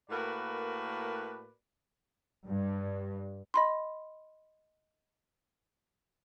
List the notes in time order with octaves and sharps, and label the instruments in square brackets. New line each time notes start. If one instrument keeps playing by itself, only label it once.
[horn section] A2 A#3 F#4 A#4 B4 D5
[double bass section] G2
[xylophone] D#5 B5 C6